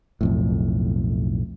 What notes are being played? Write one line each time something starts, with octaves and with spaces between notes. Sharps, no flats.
B1 F2 A2